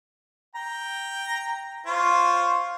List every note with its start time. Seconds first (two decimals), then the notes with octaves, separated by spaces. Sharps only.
0.55 G5 A#5
1.86 F4 C5 C#5